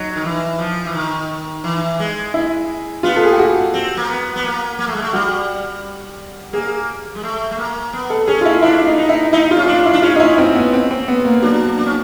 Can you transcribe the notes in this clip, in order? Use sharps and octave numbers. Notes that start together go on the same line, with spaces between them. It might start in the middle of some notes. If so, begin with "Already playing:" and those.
Already playing: F#3 D#4
D#3
E3
F3
E3
D#3
E3
G#3
E4
B3 F4
A4
G#4
G4
F#4
C4
A#3
B3
B3
A#3
A#3
A3
G#3
A3
G3 F#4
A#3 G#4
G#3
A3
A3
A#3
B3
A4
C#4 G#4
F4
E4
D4 E4
D#4
D#4
E4
D#4 E4
F4
C#4
D4 F4
E4
D4
C#4 F4
D#4
E4
C4
B3
C4
C4
B3
A#3
F#3 D4
D4
C#4